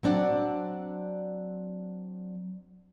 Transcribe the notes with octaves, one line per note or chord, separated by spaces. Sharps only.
F#3 C4 D4 D5 F#5